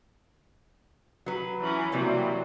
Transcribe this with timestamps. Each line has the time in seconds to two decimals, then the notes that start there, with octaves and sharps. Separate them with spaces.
1.26 F#3 B4
1.60 E3 C#4
1.92 C3 E3 F#3 G3 A#3